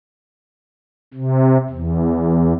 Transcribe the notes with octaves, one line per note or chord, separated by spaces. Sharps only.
C3
E2